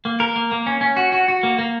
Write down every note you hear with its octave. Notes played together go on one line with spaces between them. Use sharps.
A#3
A#4
A#3
A#3
C#4
C#4
F#4
F#4
F#4
A#3
A#3